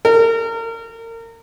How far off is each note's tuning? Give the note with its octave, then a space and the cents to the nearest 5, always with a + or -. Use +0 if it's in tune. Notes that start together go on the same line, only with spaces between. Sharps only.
A#4 -30